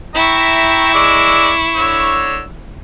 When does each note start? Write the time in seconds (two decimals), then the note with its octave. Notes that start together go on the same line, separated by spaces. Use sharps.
0.15 E4 E5 G5 A#5 C#6
0.94 G#3 D5 E6
1.76 D3 C#5 E6